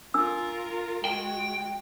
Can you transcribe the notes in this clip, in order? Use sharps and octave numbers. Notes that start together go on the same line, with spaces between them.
D4 F4 A#4 E6
G#3 F#4 G5